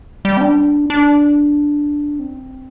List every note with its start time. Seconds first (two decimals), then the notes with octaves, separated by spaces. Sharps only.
0.25 G3
0.37 C4
0.41 D4
0.90 D4
2.19 C4